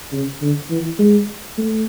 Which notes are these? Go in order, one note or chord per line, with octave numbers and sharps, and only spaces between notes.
C#3
D3
E3
G#3
A3